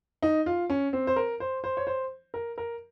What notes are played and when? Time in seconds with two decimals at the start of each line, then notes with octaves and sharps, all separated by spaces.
0.22 D#4
0.46 F4
0.70 C#4
0.93 C4
1.07 C5
1.16 A#4
1.40 C5
1.64 C5
1.77 C#5
1.87 C5
2.34 A#4
2.58 A#4